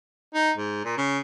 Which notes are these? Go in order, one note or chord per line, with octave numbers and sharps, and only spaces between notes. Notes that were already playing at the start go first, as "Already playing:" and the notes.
D#4
G#2
A#2
C#3